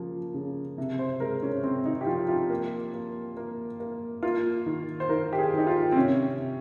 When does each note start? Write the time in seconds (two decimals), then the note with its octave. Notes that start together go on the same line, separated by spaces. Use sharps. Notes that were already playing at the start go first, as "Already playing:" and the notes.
Already playing: C#3 F3 A#3
0.34 C#3
0.78 C3
0.99 C5
1.20 G#3 A#4
1.42 C#4
1.64 C3 C4
1.86 D#4
2.01 G4
2.07 F3 F4
2.29 F4
2.50 A#3
2.94 A#3
3.37 A#3
3.80 A#3
4.23 A#3 F4
4.66 D#3
5.00 C5
5.09 D#3 A#4
5.33 G4
5.39 G#4
5.53 D#3 D#4
5.67 F4
5.92 C4
5.96 C3 C#4
6.39 C3